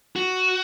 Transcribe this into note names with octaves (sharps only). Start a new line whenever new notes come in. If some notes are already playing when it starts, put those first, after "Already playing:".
F#4